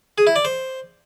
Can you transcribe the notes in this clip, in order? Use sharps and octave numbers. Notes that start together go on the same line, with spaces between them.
G#4
E4
D5
C5